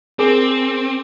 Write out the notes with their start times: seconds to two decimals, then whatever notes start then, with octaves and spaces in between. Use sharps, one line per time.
0.19 C4 G#4 A#4 D6